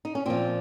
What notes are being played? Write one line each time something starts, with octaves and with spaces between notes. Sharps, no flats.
D#4
C#4
A#2 F3 C4